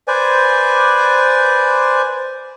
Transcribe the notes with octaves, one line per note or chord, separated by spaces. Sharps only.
B4 C5 D5 G#5